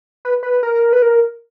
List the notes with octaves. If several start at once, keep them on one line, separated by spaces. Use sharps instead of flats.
B4
B4
A#4
B4
A#4